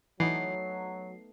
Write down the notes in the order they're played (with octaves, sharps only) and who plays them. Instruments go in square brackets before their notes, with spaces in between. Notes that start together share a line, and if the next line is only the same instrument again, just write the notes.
[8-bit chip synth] E3 [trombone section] F#3 [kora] A3 B3 D#4 [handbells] C7